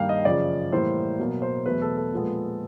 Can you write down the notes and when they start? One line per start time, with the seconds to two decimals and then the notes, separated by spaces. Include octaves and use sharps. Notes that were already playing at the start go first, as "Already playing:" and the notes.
Already playing: G2 D#3 G3 A#3 F5 G5
0.09 D#5
0.25 F#2 C#3 F3 D5
0.72 A2 E3 G3 A#3 C5
1.19 B2 F#3 A#3
1.42 C5
1.65 E2 B2 F#3 A3 B4
1.81 A4
1.97 A4
2.13 A#2 F3 G#3 B3